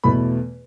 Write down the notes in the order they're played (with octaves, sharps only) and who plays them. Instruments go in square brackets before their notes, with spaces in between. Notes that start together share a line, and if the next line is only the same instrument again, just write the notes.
[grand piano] E2 B2 A3 B5